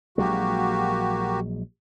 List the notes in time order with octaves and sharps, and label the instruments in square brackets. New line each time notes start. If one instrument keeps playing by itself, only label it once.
[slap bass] A#1 F#3 G#3 [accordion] A#3 F#4 G4